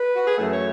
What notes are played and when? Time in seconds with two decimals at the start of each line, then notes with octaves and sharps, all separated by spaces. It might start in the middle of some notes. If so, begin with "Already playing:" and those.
Already playing: B4
0.15 F#4
0.27 G#4
0.37 F#2 E3 A3 A4
0.52 C#5